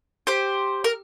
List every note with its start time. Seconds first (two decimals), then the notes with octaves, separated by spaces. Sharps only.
0.27 G4 C5
0.84 A#4